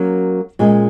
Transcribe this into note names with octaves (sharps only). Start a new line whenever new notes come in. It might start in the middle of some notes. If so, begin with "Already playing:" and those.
Already playing: F#3 A#3 C#4 F#4 A#4
A#2 G#3 C#4